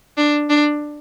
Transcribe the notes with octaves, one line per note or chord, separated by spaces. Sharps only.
D4
D4